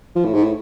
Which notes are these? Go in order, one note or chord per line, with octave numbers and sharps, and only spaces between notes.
F3
A2
G#2
A2